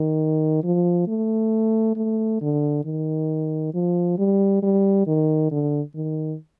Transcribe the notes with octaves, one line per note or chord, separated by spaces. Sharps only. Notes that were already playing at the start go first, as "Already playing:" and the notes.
Already playing: D#3
F3
A3
A3
D3
D#3
F3
G3
G3
D#3
D3
D#3